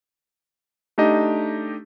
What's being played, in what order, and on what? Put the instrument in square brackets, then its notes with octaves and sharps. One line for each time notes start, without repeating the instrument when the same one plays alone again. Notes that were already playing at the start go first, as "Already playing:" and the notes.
[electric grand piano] A3 D4 D#4 G4 D#5